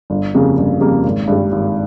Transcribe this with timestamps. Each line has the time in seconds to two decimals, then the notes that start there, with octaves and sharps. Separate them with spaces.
0.10 G1
0.34 F2 C#3 G3 A#3
0.58 G1
0.81 F2 C#3 G3 A#3
1.04 G#1
1.28 G2 G3
1.52 G#1